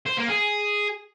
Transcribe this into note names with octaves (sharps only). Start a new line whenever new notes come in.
C5
A#3
G#4